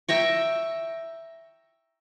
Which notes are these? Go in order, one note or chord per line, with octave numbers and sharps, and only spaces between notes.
E5 G5 A#5 C#6